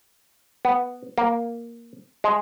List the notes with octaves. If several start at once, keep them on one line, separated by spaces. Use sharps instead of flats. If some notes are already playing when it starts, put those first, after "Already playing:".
B3
A#3
G#3